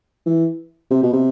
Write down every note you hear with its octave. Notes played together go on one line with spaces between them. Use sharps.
E3
C3
B2
C3